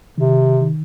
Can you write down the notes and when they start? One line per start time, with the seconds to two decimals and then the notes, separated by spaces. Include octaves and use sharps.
0.18 C3 D#3
0.62 D#3